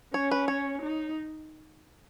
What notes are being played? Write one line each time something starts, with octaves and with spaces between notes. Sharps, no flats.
C#4 C#5
B4
C#5
D#4